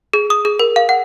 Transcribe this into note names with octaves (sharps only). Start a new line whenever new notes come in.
G#4
D#6
G#4
A#4
F5
F#5